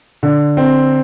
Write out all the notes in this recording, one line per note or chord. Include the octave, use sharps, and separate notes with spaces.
D3
C4